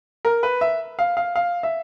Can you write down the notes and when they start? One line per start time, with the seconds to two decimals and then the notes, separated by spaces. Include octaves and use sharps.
0.25 A#4
0.43 B4
0.61 E5
0.99 F5
1.17 F5
1.36 F5
1.63 E5